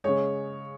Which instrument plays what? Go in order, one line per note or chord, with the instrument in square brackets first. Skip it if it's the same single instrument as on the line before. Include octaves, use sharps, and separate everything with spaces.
[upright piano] C#3 G#3 C#5